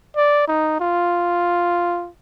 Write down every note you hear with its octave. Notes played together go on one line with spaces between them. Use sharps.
D5
D#4
F4